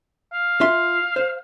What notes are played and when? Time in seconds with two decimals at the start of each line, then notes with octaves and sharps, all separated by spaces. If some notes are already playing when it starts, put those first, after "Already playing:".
0.33 F5
0.61 F4 E5 C6
1.16 C5